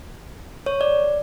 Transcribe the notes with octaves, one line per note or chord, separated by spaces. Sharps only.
C#5
D5